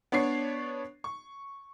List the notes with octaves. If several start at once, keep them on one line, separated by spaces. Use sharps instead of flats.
B3 D4 C#5 C#6 C7
C#6